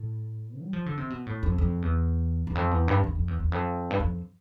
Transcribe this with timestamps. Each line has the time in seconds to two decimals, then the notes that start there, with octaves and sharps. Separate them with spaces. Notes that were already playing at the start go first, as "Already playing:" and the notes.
Already playing: A2
0.61 G3
0.73 F3
0.86 D3
0.97 C3
1.10 B2
1.26 A2
1.43 F2
1.58 F2
1.82 E2
2.47 E2
2.55 F2
2.71 E2
2.88 G2
3.04 E2
3.15 F2
3.28 E2
3.40 E2
3.52 F2
3.90 G2
4.00 F2